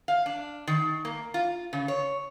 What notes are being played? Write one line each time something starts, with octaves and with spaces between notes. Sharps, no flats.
F5
D4
D#3
A#3
F4
C#3
C#5